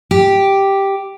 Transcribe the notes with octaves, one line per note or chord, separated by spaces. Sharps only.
G4